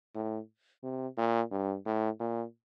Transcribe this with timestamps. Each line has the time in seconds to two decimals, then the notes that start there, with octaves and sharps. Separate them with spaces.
0.15 A2
0.84 C3
1.18 A#2
1.52 G2
1.86 A2
2.20 A#2